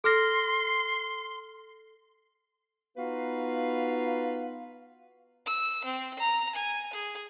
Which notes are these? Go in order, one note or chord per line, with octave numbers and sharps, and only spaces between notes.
A4 C6 F6 A#6
B3 D#4 F4 F#4 B4 F5
E6
C4
A#5
G#5
G#4